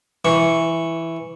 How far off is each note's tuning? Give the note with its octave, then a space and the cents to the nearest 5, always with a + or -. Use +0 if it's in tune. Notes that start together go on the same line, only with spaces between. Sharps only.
E3 +0 C#6 -5